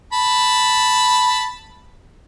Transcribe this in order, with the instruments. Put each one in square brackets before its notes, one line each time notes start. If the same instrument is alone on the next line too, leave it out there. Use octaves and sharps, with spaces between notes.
[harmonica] A5 B5